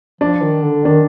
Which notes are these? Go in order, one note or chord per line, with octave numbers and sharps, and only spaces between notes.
F3 D4
D#3
D3
D#3 D4